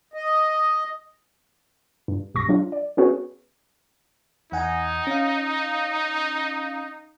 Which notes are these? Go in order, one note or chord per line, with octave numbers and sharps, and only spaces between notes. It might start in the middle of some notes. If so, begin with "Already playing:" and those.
D#5
G2
B1 G2 C#6 A#6
F#3 D4 F4
D5
B3 C#4 F#4 G#4 B4
E2 D#4 F#5 G#5
C#4 F5